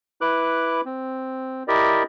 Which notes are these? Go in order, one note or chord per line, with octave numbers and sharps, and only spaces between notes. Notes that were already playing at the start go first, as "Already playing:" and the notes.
E4 B4 D6 F#6
C4
E4 G4 A#4 D5 D#5